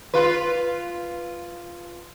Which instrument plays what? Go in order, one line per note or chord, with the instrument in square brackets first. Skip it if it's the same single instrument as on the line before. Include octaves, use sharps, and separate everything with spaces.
[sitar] F4 B4